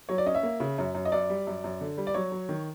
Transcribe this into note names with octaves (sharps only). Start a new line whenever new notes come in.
F#3 C#5
D5
C#4 D#5
E5
A#3
C#3
F#2
F#2
D#5
F#2 D5
G3
F#2
F#2
D3
G3
D5
F#3 C#5
F#3
D#3